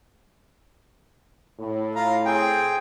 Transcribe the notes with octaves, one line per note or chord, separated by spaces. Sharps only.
A2
F4 F5 A#5
C4 G#4 G5